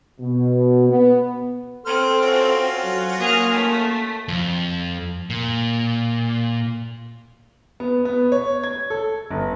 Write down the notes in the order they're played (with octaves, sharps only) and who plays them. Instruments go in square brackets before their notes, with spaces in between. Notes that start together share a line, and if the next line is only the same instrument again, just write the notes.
[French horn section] B2
B3
[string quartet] C4 [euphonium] A4 [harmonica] C5 C6 F6
[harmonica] C#4 F4 F#4
[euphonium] F#3
[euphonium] A#3 [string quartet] G#4 F6
[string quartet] A3
[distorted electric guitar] F2
A#2
[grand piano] B3
B3
C#5
G#6
A4
G1